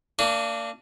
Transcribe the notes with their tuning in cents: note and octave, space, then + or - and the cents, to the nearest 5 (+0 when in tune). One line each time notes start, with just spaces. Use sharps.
A#3 -35 D4 -5